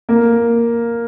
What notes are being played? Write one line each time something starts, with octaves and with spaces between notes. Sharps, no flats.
A#3